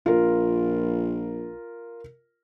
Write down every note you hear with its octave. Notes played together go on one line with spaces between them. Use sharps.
A#1 F4 A#4